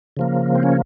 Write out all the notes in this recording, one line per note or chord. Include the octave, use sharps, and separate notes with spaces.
C#3 F3 A#3
C4
C#4